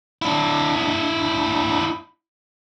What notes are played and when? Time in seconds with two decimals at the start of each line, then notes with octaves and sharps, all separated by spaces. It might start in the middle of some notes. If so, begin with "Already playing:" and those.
0.22 D4 E4